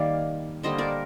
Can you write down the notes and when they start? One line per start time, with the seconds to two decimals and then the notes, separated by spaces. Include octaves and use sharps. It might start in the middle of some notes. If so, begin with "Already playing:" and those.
Already playing: D#3 G3 A#3 D5 F5
0.63 D3 G3 A#3 C5 D#5
0.78 A#4 D5